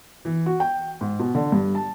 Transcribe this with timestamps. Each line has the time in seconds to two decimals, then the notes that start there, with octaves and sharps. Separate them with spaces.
0.25 E3
0.46 F#4
0.60 G5
1.01 G#2
1.20 B2
1.35 D3
1.52 G2
1.75 A5